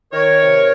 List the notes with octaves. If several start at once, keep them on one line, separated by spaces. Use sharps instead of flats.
D#3 A#4 C#5
C3